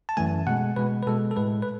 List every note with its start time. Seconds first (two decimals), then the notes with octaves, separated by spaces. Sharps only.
0.09 A5
0.17 F#2 E3 A3 G#5
0.47 B2 G#3 F#5
0.76 B2 G#3 B4
1.03 B4
1.07 B2 G#3 A4
1.31 A4
1.36 A2 G#3 B4
1.62 B4